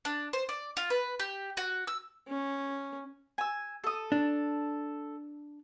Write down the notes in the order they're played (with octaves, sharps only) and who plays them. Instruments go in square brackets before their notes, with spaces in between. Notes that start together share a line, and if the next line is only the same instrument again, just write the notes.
[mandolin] D4
C5
D5
F4
B4
G4
F#4
E6
[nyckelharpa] C#4
[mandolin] G#5 E6
A4 D#6
[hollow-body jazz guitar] D4